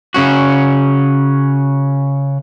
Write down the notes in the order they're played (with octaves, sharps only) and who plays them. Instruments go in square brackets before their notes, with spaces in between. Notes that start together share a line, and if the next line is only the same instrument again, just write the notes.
[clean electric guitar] C#3 C#4 F#4